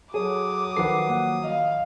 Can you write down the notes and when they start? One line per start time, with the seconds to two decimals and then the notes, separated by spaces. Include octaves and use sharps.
0.14 F#3 G#4 A4 C#5 D6 D#6
0.77 D#3 F3 A4 B4 F#5 C7
1.09 A#3 F#5
1.44 D#5 F5